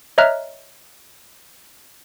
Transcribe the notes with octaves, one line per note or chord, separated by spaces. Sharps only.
C#5 D#5 E5 A#5 F6 F#6